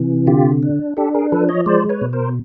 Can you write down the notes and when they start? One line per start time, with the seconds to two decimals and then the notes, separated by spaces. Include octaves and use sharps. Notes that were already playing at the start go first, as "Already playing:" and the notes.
Already playing: C3 E3
0.27 D3 F4 G4
0.63 D4
0.97 D4 G4 A4
1.14 G#4 A#4
1.32 F3 A4 B4
1.49 C#5 D#5
1.66 G#3 C5 D5
1.89 B4 C#5
2.01 B2
2.13 A#4 C5